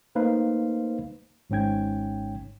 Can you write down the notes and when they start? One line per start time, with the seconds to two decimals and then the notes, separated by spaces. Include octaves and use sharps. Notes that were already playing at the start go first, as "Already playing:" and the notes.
0.15 A3 A#3 D#4 B4 C5 F5
1.50 G#1 G#2 C#4 G5 G#6